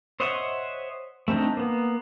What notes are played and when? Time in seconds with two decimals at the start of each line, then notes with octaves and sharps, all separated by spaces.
0.20 C5 C#5 D#5 E5 F#5
1.28 A3 C4 D4 D#4
1.57 A#3 B3